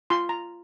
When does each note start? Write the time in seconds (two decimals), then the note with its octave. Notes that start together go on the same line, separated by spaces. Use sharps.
0.10 F4 C6
0.29 A#5